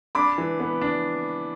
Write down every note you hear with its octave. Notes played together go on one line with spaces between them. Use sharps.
D4 B5 D6
E3
B3
D4